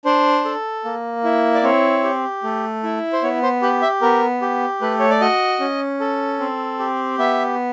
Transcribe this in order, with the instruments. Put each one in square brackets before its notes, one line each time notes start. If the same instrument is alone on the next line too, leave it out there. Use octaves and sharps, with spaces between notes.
[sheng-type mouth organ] D4 C5
A4
A#3
E4
D5
C4 C#5
G4
A3
E4
C5
B3 C#5
C5
G4 B4
E5
B3 A#4
G4
A3 B4
C#5
D5
F#4 D#5
C#4
A4
C4
G4
B3 E5